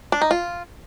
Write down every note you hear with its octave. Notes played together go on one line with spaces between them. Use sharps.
D4
D#4
F4